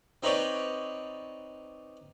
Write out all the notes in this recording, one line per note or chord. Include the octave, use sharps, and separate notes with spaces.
C4 D#4 B4 C#5 D5 G5